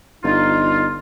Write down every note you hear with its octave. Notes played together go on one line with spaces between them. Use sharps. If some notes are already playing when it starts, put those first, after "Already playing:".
G1 D#4 F4